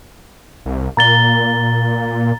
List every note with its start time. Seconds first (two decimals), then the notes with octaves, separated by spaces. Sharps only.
0.66 C2
0.97 A#2 A#5 A6 G7